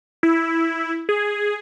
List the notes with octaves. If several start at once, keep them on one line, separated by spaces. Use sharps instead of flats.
E4
G#4